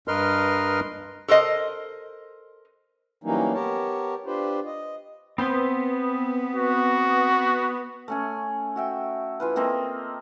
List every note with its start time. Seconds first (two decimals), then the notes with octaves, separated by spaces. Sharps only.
0.08 G2 A#4 B4 D#5 C6 F6
1.28 A4 A#4 C5 D#5
3.24 E3 F#3 G3 A#3 C#4 D#4
3.53 B3 G4 A#4 C#5 A5
4.26 D4 F4 G4 B4 C5
4.66 D#5
5.38 B3 C4 C5 C6
6.55 F#4
8.08 A3 C#4 G#5
8.76 F#4 E5 G5
9.40 E3 F4 B4
9.56 A#3 C4 A4 D#5